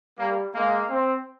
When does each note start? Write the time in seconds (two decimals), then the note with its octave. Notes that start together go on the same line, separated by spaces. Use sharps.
0.19 G3 A#3
0.55 G#3 A#3
0.90 C4